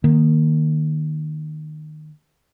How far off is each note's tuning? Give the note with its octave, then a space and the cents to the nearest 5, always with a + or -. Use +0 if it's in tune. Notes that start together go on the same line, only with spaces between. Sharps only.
D#3 -20 A#3 +0